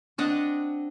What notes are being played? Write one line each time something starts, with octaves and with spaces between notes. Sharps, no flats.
C4 D4 D#5 F#5